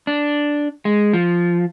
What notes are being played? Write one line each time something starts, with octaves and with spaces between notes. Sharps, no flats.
D4
G#3
F3